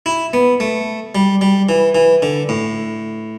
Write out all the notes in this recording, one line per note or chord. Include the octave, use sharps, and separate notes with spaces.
E4
B3
A3
G3
G3
E3
E3
D3
A2